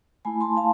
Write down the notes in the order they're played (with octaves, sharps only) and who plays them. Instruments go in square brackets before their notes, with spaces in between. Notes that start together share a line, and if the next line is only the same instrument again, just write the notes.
[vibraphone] A3 E4 G#5 B5
A5 C6
F5 A5